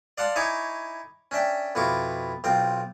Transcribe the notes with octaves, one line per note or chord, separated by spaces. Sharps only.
D5 F5 F#5 A5 C6
D#4 E4 C#5 G#5 C#6 D6
C#4 D4 E5 G5
F2 B2 E4 F4 C#6 D6
B1 C4 F4 G5